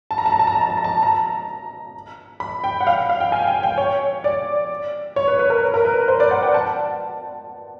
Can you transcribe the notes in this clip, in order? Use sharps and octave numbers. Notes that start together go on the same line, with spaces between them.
A5
A#5
A5
A#5
A5
A#5
A5
A#5
A5
A#5
A5
A#5
B5
G5
F#5
F5
F5
G5
G#5
G5
G5
C#5
D5
C#5
B4
B4
A#4
A#4
B4
C5
D5
F#5
G5
A5